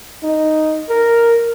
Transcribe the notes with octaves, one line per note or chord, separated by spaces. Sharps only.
D#4
A#4